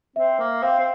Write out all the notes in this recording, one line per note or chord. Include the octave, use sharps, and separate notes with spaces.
C4 E5
A#3
C4 F5
C4